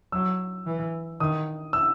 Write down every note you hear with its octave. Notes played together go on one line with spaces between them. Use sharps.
F#3 E6
E3
D#3 D#6
E6